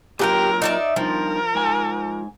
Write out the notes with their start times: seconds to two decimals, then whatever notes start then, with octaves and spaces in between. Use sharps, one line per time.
0.19 A#2 F#3 G4 A#4 F#5 G5
0.62 D#4 D5 E5
0.96 G2 D#3 F3 A#4
1.55 G#2 G#5